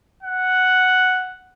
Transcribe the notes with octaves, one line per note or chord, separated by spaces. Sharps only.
F#5